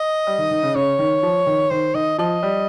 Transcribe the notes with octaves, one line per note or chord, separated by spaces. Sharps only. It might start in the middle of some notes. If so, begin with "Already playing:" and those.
Already playing: D#5
G3
D#3
D#3
C#3
C#3 C#5
D#3
F3
D#3
D#3 C5
D#3 D#5
F3 D#5
G3